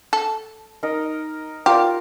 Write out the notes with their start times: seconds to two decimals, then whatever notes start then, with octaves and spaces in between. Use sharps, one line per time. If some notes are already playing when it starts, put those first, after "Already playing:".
0.13 A4
0.83 D#4 A#4 D#5
1.66 F4 G4 A#4 D5